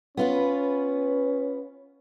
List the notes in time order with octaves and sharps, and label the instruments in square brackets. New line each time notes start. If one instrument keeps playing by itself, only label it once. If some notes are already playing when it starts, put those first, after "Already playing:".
[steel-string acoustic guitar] B3 F4 B4 [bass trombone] C#4